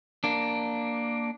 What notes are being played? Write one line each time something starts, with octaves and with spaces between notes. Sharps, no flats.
A#3 D4